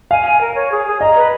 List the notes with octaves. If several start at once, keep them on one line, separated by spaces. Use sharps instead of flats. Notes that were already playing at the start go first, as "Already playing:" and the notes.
F5 G#5
G#5
A#4
C#5
G#4
G#4
D#5 A#5
B4